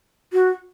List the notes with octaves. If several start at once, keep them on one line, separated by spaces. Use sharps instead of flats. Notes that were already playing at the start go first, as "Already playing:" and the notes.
F#4